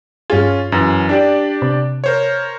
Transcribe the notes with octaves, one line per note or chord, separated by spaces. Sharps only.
G2 C#4 F4 G#4
F#2 E3
D4 G4 D5
C3
A#4 C5 C#5